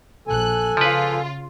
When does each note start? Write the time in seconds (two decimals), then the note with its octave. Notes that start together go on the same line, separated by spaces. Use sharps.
0.28 A#1 A4 G#5 F#6
0.77 C#3 F3 F4 B4